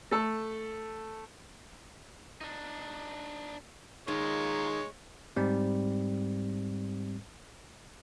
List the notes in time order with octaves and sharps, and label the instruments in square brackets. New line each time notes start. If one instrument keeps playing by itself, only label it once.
[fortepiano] A3 A4
[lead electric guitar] D4 D#4
[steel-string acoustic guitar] D#3 [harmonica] G#3 C#5 [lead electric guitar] F4 A#4
[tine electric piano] G#2 G3 C4